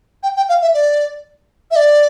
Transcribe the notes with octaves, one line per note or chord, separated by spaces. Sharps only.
G5
G5
F5
E5
D5
E5
D5